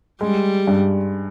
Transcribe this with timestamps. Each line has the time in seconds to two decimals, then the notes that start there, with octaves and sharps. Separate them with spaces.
0.21 G3 G#3
0.67 G2